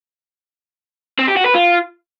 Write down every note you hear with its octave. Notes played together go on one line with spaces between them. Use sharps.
C4
G4
F#4
B4
F4